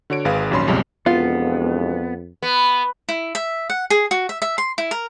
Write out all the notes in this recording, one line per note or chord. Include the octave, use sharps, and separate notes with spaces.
D3 F#4 C#5 D7
G#1 G#4 B4 F5
A#1 D#2 F#3 C#4 B5 C6
B1 F2 C#3 G3 G#3
E1 F2 B3 F4
B3
E4
E5
F#5
G#4
F#4
E5
E5
C6
E4
A#4